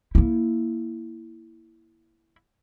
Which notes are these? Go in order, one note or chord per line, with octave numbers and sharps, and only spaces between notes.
A#3 E4